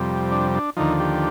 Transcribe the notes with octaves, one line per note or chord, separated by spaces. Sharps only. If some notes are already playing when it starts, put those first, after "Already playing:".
Already playing: F2 C3 G3
D4
D4
D#2 D3 F3 D#4
G4